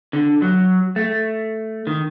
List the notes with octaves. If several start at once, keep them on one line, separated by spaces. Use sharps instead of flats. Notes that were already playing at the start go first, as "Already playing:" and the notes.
D3
F#3
A3
D#3